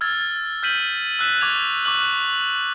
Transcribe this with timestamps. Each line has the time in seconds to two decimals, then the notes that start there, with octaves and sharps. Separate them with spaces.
0.01 E6 F6 G#6 A6
0.63 F6 G6 B6 D#7 F#7
1.19 E6 F#6 B6 E7
1.41 C#6 D6 G#6 F7
1.85 C#6 D6 F#6 F#7